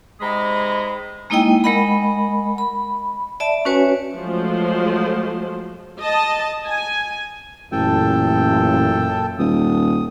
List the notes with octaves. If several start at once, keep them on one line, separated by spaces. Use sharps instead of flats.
G#2 C3 G#3 G#4 A#5 B5
G#3 A#3 D#4 E4 D#5 G5
G#3 A#4 D#5 F#5 B5
B5
D5 E5 A5
C#4 F#4 B4 C#5 G#5
F3 F#3 G#3 A3 C5
D#5 A5
G#5
A1 F#2 A#2 A4 G5 A5
D#1 D#6